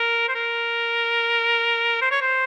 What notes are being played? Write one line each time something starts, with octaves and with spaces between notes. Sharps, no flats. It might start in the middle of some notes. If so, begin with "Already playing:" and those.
Already playing: A#4
C5
A#4
C5
C#5
C5